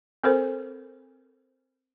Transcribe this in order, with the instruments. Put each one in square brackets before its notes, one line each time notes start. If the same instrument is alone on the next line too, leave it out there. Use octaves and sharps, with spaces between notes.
[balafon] C4 A4 A#4 C5